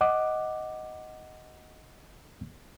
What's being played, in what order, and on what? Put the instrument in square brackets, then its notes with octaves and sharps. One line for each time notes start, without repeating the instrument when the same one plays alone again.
[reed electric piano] D#5 F#5 D6